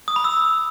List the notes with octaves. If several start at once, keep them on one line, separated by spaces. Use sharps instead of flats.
D#6
B5
E6